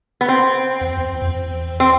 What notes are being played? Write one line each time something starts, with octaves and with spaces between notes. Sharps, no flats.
B3
C4
E2
F2
E2
F2
E2
F2
E2
F2
E2
C4